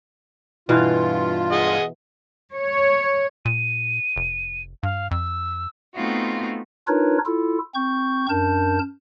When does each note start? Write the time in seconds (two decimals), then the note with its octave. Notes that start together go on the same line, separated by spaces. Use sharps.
0.69 G2 B2 E3 F4 F5
1.52 G#4 D#5 F#5
2.55 C#5
3.45 A#2 D#7
4.16 F1
4.83 G2 F5
5.11 F2 E6
5.95 A3 B3 C4 D#4 F4 F#4
6.87 D4 D#4 F4 A#4 B4 C#5
7.25 E4 F4 A4
7.75 C4 C#6 G6
8.29 F#2 D4 A#4 A5 G6